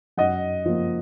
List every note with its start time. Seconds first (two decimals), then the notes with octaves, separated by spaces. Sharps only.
0.17 F#2 D#5 F#5
0.66 F3 A#3